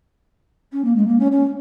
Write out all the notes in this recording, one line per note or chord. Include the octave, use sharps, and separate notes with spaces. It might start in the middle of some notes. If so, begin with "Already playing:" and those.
C#4
A#3
G#3
A#3
C#4
C#4